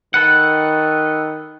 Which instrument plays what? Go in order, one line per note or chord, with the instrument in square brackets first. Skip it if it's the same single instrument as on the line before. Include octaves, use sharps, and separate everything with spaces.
[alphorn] D#3 [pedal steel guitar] A4 B4 F#5